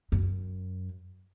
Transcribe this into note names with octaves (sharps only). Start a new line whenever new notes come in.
F#2